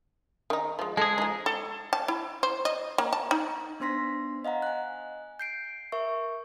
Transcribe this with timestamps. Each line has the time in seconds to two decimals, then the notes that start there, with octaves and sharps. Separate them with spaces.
0.50 D#3 D#4
0.79 F3 G#3
0.97 G#3 G#4 A4
1.18 F3 D#4
1.46 A4
1.93 A5
2.08 E4
2.43 C5
2.65 D#5
2.98 A#3
3.13 A5
3.31 D#4
3.80 B3 D4 C5 C6 A#6 B6
4.45 D#5 F5 F#5 A#5
4.62 G#5 F#6
5.39 G6 C7 D7
5.92 A#4 E5 C#6